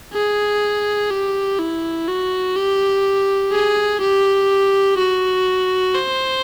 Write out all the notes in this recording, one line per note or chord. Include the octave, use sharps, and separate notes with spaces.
G#4
G4
E4
F#4
G4
G#4
G4
F#4
C5